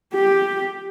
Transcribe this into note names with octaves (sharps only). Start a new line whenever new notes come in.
G4